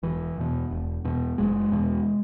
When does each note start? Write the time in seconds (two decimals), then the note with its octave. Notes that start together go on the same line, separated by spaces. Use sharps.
0.03 E1 E3
0.37 E2 B2
0.71 E1
1.05 E2 B2
1.38 F#1 G#3
1.72 E2 B2